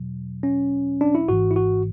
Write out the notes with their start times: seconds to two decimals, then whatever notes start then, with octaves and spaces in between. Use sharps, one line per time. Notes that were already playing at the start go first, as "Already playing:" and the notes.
Already playing: E2 B2 F#3
0.43 C#4
1.01 D4
1.15 E4
1.28 G#1 G#2 E3 F#4
1.51 E4
1.56 F#4